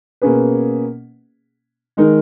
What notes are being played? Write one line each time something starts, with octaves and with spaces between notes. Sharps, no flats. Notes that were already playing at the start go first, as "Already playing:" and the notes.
B2 A#3 C#4 G#4 B4
D#3 G#3 D#4 A#4